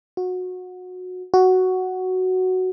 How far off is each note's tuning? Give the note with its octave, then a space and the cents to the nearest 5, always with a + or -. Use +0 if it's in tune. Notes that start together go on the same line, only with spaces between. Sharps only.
F#4 -20
F#4 +5